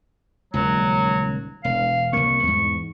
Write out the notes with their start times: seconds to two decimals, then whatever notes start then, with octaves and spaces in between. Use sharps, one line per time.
0.54 D#1 C#2 F#3
1.65 E1 F5
2.13 C2 A#3 C#6
2.43 E2 G#2